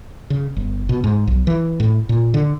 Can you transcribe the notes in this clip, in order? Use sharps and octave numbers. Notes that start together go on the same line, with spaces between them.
C#3
G1
B2
G#2
B1
E3
A2
A#2
D3